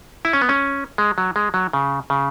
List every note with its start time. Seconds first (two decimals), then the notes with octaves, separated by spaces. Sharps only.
0.25 E4
0.33 C#4
0.42 B3
0.49 C#4
0.98 G#3
1.18 F#3
1.36 G#3
1.54 F#3
1.73 C#3
2.10 C#3